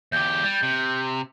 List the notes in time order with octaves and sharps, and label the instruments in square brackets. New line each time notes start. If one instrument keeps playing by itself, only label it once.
[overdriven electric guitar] E2 G4 [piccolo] G6
[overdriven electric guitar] G3
C3